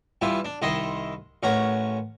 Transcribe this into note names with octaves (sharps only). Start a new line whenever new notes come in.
E3 G3 E4 F4
D4
C2 D#3 E4 D#5 C6
A1 C#4 A#4 C#5 F#5